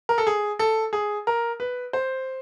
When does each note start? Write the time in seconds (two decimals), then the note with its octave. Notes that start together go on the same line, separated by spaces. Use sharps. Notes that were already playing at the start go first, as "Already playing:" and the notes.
0.09 A#4
0.18 A4
0.27 G#4
0.59 A4
0.93 G#4
1.27 A#4
1.60 B4
1.93 C5